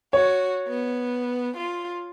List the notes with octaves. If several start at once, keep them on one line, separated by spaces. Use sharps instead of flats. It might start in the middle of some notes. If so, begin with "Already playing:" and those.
F#4 C#5
B3
F4